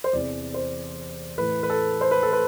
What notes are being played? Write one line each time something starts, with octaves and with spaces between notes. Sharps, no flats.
C5
E2 C3 E3 D5
C5
A2 E3 B4
B4
A4
C5
B4
A4
B4